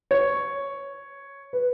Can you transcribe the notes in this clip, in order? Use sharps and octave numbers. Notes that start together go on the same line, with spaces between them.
C#5
B4